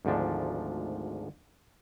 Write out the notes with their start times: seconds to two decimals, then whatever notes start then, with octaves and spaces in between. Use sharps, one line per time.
0.05 G#1 D2 G#2 F3 D4